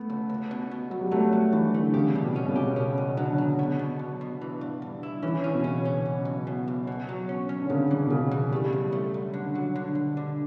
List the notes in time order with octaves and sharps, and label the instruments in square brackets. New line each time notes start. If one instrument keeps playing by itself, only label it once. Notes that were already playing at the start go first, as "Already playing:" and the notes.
Already playing: [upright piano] A3 B3
[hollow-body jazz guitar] C#2
C#2
B2
B2
[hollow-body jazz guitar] C#2 [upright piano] F#3
[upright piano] G3
[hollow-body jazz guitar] F#3 [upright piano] A3
[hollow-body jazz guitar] F#3 [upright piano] G3
[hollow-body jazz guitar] G2 [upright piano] E3
[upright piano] D3 [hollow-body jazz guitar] A3
[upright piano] C#3 [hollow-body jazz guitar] G4
[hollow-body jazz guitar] G3
[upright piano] B2
[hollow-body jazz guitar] C#4
[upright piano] B2
C#3
[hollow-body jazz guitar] G4
[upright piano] C#3 [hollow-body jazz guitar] C#4
[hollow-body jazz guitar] E2
[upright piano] D3 [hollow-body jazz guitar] F#3
[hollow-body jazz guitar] F#3
B2
B2
B1
B2
E3
G2
G2
E4
[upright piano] E3 [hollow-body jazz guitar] C#4
[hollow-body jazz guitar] C#4
[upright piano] B2
[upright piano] C#3 [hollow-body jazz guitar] C#4
[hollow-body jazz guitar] C#4
B1
B1
B2
B1
B2
F#3
C#4
C#4
[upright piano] D3
[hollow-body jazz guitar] B1 [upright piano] C#3
[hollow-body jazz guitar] E3
[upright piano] B2
[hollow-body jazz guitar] B1 [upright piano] C#3
[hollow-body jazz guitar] E3
[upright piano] G3 [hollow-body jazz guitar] A3
[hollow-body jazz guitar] F#2
A3
F#2
D3
F#3
D3
D2
D3